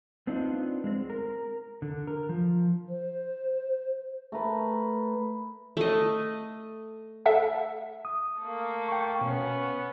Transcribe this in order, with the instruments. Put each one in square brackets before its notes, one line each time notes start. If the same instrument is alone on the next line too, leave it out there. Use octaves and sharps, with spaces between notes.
[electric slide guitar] B3 C4 D4 D#4 F4
G#3 C4
A#4
D3
A#4
F3
[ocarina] C5
[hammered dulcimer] A3 A#4 B4
[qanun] A3 D#5
[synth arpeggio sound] A4 E5 F#5
[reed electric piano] D#6
[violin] A3 A#3
[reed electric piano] G5 C#6
[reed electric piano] B2 [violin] B3 C#4